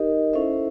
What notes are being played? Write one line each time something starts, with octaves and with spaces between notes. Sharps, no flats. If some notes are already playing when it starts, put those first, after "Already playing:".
Already playing: D#4 G4 A#4 D#5
C#4 E4 A4 C5 E5